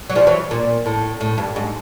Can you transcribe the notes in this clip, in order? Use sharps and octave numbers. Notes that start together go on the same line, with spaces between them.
F#3
F3 G3
E3 F#3
A#2
A2
A2
G2
G#2